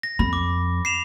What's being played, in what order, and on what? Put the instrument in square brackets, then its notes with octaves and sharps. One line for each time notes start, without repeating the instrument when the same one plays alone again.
[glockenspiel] A#6
[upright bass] F2 [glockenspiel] B5
[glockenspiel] D6
C7 E7 F7